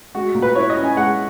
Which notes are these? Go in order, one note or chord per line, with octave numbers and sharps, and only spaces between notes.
G#3 F#4
A#2
B4
E4 C#5
D#5
C#4
G#5
G#3 F#5